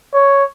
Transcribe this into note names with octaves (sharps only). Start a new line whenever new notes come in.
C#5